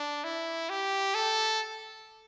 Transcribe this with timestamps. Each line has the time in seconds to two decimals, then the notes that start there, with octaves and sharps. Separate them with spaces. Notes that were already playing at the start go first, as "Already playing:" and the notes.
Already playing: D4
0.24 E4
0.69 G4
1.14 A4